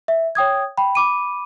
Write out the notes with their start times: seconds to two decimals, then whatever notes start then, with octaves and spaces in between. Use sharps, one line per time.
0.08 E5
0.35 C#5 G5 D#6 G#6
0.77 G5 B5
0.95 B5 D6 D#7